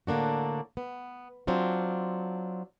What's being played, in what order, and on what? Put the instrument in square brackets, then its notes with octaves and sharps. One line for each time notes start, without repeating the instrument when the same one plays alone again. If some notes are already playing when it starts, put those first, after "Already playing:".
[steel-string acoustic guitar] A2 D3 A#3 D4 F#4
B3
F#3 C4 D4 F4